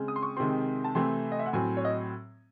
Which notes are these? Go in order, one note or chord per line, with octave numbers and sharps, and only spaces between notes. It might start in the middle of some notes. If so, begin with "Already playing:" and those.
Already playing: C#3 G#3 C4
D#6
C6
C#6
C3 D#3 G#3 C4 C6
A5
C3 E3 A3 C4 C6
D#5
E5
F#5
A2 F#3 C4 G#5
C#5
D#5